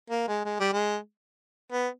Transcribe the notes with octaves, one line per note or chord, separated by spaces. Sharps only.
A#3
G#3
G#3
G3
G#3
B3